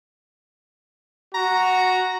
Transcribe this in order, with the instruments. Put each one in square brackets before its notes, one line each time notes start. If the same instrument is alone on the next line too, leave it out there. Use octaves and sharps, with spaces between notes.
[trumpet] F#4 [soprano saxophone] A#5